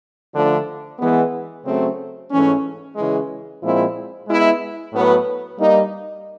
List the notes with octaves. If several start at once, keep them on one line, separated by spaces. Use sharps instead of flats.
D3 F3 A3 D4
E3 G#3 B3
C#3 F#3 A3 C4
G#2 E3 A3 C#4
C#3 E3 G#3
A#2 F3 G#3 C4 E4
G#3 B3 E4
A2 F#3 B3
G3 A#3 D#4